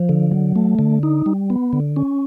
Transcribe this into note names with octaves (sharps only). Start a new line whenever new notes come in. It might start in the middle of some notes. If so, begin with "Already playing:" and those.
Already playing: F3
D3
F#3
A3
D3
D#4
G3
B3
D3
C#4